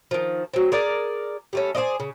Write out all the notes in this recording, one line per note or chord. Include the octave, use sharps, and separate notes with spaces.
D#3 F3
F#3 C4
G#4 A#4 D5
G3 A3 C#4
G#4 C5 D5 D#5
C#3